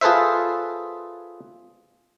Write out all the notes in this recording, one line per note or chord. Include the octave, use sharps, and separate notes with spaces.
F4 G#4 A4 B4 C5 E5